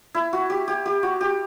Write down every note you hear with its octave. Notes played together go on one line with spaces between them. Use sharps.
E4
F#4
G4
G4
G4
F#4
G4